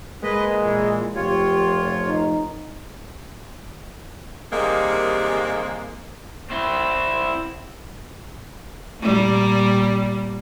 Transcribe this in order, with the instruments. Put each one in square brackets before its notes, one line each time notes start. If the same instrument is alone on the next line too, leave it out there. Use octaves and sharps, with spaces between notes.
[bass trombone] G#3 [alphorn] A#3 [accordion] B4 D#5
[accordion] A#2 E3
[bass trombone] F1 [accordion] F4 C#5 [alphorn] G4
[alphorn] D#4
[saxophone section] C3 D#3 G3 G#3 A#3
[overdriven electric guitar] C4 E4
[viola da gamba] A#2 G3 A#3